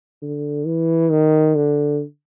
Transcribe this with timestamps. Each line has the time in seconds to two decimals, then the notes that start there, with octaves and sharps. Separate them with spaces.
0.22 D3
0.66 E3
1.11 D#3
1.56 D3